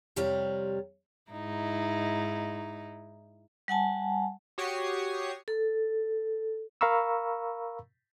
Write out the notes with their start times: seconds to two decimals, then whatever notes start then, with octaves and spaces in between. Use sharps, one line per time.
0.16 F2 C3 G3 C#5 F5 A#5
1.32 G#2 D#4 E4
3.68 G3 F#5 G#5 A5
4.58 F#4 G4 C#5 C#6 D#6 C7
5.48 A4
6.81 A#4 F5 A#5 B5 C#6 E6